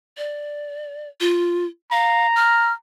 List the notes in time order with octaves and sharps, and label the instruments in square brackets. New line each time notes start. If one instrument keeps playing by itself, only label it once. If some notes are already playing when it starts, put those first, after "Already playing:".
[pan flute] D5
F4
[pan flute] F5 [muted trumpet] A#5
[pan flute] F6